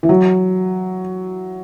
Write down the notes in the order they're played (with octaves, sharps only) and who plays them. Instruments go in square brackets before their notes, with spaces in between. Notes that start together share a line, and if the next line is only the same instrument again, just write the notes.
[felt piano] E3
F#3